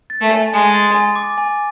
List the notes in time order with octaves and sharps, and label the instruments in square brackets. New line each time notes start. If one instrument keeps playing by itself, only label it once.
[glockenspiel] A6
[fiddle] A3
[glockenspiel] G#5
[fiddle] G#3 [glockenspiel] G#5
[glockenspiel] A6
G#5
D6
G#5